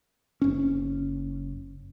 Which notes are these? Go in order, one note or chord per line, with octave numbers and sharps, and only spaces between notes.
F#1 C#4